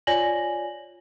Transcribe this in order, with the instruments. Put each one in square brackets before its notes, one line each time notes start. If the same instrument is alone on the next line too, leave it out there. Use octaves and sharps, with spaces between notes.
[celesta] F4 C#5 D5 G#5 A#6 F#7